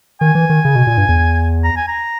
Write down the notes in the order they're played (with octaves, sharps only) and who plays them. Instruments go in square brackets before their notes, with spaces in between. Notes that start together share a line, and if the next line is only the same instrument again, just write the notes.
[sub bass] D#3 [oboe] G#5
[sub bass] E3
D#3
C#3
B2
A#2
G2
E2
[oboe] A#5
G#5
A#5